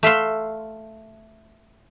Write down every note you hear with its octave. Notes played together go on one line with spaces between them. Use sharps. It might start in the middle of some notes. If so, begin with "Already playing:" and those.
A3 E5 F5 C6